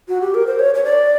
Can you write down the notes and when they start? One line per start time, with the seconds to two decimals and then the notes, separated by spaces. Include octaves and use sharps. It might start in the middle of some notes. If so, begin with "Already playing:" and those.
0.08 F#4
0.21 G4
0.35 A#4
0.47 C5
0.59 C#5
0.74 C#5
0.84 D5